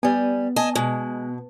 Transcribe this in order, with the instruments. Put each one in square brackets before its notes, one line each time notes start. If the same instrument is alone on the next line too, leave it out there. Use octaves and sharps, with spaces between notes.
[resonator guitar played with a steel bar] G3 G#5 [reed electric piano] B3
[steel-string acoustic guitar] D#5 G#5 A5
[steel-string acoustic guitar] B2 [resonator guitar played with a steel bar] G#3